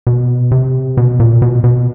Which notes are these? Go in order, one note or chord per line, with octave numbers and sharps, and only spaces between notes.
B2
C3
B2
A#2
B2
B2